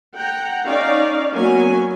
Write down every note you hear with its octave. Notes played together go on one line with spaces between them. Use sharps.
F#5 G5 A#5
C#4 D#4 D5 F5
F#3 A#3 B3 C#4 G#5